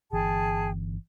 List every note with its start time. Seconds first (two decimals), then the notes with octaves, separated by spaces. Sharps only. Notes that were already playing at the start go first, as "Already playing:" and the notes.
0.12 G1 E3 G#4 G5 A5